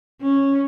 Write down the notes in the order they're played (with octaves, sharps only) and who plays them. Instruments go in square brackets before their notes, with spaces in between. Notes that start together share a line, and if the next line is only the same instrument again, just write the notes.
[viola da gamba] C#4